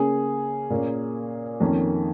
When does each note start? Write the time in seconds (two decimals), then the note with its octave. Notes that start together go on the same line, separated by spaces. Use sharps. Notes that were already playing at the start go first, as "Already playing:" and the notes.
Already playing: C#3 A#3 C#4 G#4
0.70 A#2 A#3 C#4
1.60 F2 D#3 A#3 C#4